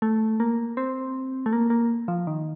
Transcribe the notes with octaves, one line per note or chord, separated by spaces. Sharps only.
A3
A#3
C4
A3
A#3
A#3
F3
D#3